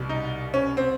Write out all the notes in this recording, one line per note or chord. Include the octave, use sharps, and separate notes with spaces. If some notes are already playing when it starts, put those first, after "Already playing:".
Already playing: C2 B2 G3
D#4
C#4
C4